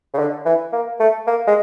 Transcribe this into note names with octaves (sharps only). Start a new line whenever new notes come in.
C#3
D3
E3
A#3
A3
A#3
G#3